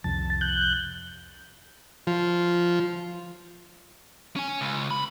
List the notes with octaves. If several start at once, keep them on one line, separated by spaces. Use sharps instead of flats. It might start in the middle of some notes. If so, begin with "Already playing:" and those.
C2 F2 A5
F#6 G6
F3
C#4 G#5
C#2
B5